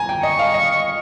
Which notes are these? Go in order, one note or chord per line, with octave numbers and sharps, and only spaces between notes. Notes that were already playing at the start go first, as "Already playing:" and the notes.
Already playing: G#5 A#5
G5
D#5 C#6
F5
D#5